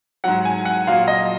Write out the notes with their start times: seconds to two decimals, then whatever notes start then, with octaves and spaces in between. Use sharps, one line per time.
0.24 G#2 F#3 F#5
0.45 G#5
0.65 F#5
0.87 A#2 F#3 F5
1.08 D#5